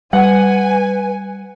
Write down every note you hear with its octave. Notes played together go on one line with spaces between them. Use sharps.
G3 B4 F#5 G#5